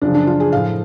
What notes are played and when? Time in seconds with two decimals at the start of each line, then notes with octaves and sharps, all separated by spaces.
0.02 F#2 C#3 F3 D4
0.15 D4
0.27 F4
0.40 G#4
0.52 A2 F3 F5